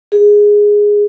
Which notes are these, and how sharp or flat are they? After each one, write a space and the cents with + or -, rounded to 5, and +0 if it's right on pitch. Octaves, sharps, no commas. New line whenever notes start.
G#4 -5